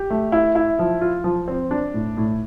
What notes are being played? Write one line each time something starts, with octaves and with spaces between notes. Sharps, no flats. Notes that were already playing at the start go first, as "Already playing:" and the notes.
Already playing: G4
A3
E4
E4
F3
F4
F3
C4
D4
A2
A2